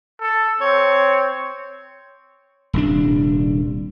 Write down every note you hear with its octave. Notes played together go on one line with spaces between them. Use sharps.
A4
C4 C#5
D#1 C2 D4